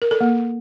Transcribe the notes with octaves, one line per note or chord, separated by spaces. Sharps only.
A#4
A4
A#3